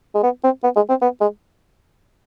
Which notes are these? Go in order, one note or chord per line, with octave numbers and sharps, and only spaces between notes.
G#3
B3
C4
B3
G#3
C4
B3
G#3